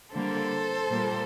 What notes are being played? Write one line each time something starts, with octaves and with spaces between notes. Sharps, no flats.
D3 G3 A#3 A4 C5
A#2 G3 A#3